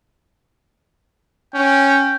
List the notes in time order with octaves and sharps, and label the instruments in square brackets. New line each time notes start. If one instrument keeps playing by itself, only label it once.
[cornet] C#4 [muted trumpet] G5